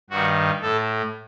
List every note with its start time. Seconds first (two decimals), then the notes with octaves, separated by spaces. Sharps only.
0.10 G2 D#3 F#4
0.61 A2 A4